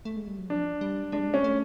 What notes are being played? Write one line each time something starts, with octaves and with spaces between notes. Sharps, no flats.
A3
G#3
G3
F#3
F3 D4
G3
G#3 D4
G3
G#3
C#4
A3